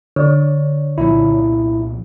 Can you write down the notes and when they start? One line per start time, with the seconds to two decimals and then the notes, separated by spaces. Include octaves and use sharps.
0.16 D3 C#5 D5
0.98 C2 A#2 F3 E4